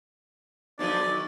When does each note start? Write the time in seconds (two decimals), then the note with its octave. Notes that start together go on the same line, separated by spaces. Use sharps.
0.79 B1 D3 F3 G#3 D5
1.04 D#3